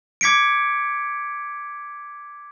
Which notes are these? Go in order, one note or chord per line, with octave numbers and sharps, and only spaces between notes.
D6 G#6 B6 C#7 D7